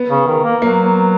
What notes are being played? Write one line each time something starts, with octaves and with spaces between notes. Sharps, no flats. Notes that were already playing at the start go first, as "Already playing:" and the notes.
Already playing: B3
C#3
D#3
A#3
F#3 A#3
B3